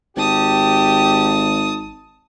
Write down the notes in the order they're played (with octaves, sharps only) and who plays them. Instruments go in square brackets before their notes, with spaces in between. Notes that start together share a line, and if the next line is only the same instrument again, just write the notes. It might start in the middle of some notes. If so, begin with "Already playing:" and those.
[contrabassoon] G#1 [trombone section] G4 [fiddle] A5 D#6